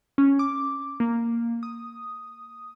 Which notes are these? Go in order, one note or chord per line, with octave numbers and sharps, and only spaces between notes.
C#4
D6
A#3
D#6